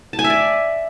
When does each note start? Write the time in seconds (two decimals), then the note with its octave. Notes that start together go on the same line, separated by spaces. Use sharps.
0.13 A5
0.19 G#5
0.24 E5
0.30 D5